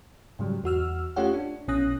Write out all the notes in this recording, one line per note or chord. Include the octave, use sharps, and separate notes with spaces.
G#2 C#3 F#3 G3
E2 F#4 E6 F6
A3 C#4 F4 G4 C#5 F#5
D4
A#1 B2 C#4 D#6 F#6 A#6